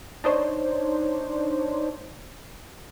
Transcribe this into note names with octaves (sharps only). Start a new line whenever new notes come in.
D4 D#4 C5 C#5